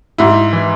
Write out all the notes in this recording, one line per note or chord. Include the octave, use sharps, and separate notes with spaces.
G#2 E4
E3